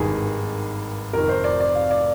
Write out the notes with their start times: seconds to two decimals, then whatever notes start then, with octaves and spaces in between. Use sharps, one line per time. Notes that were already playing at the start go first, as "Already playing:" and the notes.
Already playing: G#1 G2 D#3 G#4
1.13 F1 F2 D#3 A#4
1.29 C5
1.44 D5
1.60 D5
1.75 F5
1.91 D5